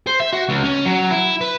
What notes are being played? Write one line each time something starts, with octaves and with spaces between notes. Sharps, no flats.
C5
E5
F#4
C#2
C#4
F#3
E4
B4